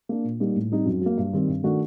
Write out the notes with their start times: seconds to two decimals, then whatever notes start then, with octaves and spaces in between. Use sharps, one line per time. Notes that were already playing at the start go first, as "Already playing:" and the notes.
0.09 A#3 D4
0.24 A#2
0.40 G3 A#3 D#4
0.56 A2
0.72 G3 C4 D#4
0.86 F#2
1.01 F#3 A#3
1.18 G2
1.33 D#3 G3 C4
1.48 G2
1.63 D#3 A3 D4 F#4